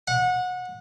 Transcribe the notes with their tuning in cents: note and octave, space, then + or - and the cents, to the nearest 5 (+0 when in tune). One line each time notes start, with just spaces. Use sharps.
F#5 -25